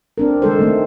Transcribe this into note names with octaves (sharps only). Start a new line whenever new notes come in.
C4 D4 A#4
D#3 G#3 A4 C5
D#3 A3 C4